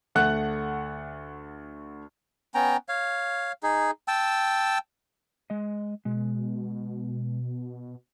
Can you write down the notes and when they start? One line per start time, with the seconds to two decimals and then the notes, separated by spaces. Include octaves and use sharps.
0.15 D2 A3 F#5 F#6
2.55 B3 C#4 G5 A#5
2.89 C#5 F5
3.63 D#4 G#4
4.08 G5 A5 E6
5.50 G#3 D#5
6.05 B2 G#3